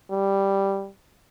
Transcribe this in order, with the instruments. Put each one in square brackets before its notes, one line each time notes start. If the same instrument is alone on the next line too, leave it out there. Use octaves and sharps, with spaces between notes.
[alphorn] G3